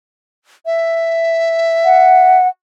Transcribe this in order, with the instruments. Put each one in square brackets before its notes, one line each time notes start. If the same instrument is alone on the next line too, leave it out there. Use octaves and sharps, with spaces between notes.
[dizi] E5
[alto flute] F#5